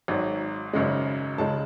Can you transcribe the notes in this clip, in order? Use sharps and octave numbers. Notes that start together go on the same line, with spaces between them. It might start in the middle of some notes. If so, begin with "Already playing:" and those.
G#1 G#2 F#3
G#1 F#2 C#3 G#3
C#2 C#3 G#3 A5